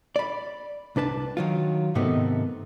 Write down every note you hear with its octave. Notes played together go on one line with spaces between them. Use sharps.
D5 B5
C2 D4 B4 A5
D#3 F#3 F4
G#2 C3 D#3 A3 B3